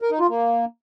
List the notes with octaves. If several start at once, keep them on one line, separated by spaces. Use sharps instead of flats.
A#4
D#4
F4
A#3